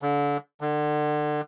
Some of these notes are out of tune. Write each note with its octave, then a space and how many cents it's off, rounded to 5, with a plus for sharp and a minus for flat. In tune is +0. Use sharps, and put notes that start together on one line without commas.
D3 -30
D3 +30